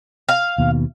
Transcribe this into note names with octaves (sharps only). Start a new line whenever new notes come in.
F5
D#2 B2